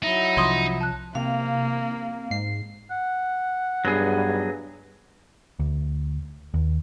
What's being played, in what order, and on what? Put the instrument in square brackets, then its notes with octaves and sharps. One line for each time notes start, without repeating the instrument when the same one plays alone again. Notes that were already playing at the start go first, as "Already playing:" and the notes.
[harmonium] F#3 E4 E5 [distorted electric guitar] D#4
[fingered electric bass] C2 F3 [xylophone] C#5 C6 D#6
[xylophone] A5 F#6
[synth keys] C3 [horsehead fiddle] A#3 [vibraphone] F5
[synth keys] G#2 C7
[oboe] F#5
[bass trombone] G2 [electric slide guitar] F#3 B3 G#4
[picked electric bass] D2
D#2